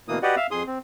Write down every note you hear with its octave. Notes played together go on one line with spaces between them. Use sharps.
D2 B2 E3 A#3 D#6
F#4 G4 B4 D5 D#5 F#5
E5 F5
F2 G#4 C6 D#6
C4